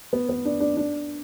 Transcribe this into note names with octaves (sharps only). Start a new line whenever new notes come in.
B3
B3
D4
D4
D4